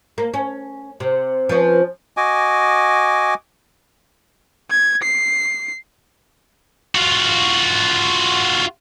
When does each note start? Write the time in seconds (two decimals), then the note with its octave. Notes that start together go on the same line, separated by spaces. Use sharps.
0.18 A#3
0.34 C#4
1.00 C3
1.49 F3 C#4 B4
2.17 F#4 D#5 G#5 D6
4.70 G#6
5.03 C7
6.95 F4 F#4